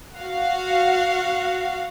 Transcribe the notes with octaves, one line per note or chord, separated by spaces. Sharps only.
F#4 F5 F#5